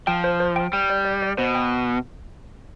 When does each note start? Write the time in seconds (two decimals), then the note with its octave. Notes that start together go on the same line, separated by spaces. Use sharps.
0.07 F3 G5
0.24 C5
0.40 C5
0.56 G5
0.73 G3 G5
0.90 D5
1.05 D5
1.22 D5
1.38 B2 C5
1.55 G5